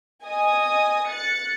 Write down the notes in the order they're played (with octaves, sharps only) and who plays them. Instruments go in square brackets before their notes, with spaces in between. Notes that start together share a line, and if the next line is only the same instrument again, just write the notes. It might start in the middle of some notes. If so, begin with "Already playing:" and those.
[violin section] D#5 G#5 D#6
F#6 A6 C#7